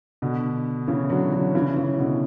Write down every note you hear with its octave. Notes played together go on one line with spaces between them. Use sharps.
B2 D3
C#3 E3
D3 F#3
D3 F#3
C#3 E3
C#3 E3
B2 D3